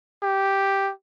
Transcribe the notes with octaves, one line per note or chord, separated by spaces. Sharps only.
G4